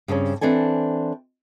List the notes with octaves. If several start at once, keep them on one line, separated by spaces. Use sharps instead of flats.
G2 C#3 C4 C#4
E3 C4 D4 A4 G#5